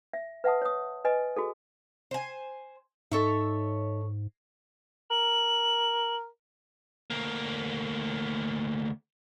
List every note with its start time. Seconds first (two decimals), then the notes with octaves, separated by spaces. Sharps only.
0.13 E5
0.44 B4 E5 F#5 A5 D#6
0.62 C#5 D#6
1.05 B4 D#5 G#5
1.37 F#4 G#4 A4
2.11 C5 G#5
3.12 G#2 D#4 A4 C#5 E5
5.11 A#4 F#7
7.10 D2 A#3